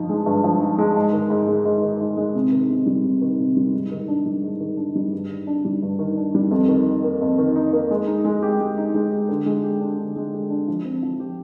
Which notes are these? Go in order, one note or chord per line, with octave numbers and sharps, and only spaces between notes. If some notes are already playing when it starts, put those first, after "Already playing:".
Already playing: G2 F3 D#4
G#3
G2
F3
D#4
G#3
G#2
D#3
G#2
G#3
G#2
D#3
G#2
G#3
C3
D#3
C3
G3
C3
D#3
C3
G3
G#2
D#3
D4
G3
G#2
D#3
D4
G3
G2
D#3
D4
G3
G2
D#3
D4
G3
F2
D#3
D#4
A#3
F2
D#3
D#4
A#3
G#3
D#4
G#3
G4
G#3
D#4
G#3
G4
D3
G#3
G4
D4
D3
G#3
G4
D4
F3
C4
F3
G4